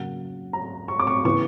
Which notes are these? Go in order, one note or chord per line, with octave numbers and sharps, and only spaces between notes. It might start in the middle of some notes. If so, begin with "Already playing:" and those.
Already playing: C#3 F#3 A#3 F#5
A#5
C#6
D6
C#6
C#3 E3 B3 C#6